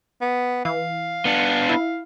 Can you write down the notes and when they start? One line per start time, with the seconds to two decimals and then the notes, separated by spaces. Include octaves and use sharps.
0.22 B3
0.65 E3 F5
1.25 B3 D4
1.69 E4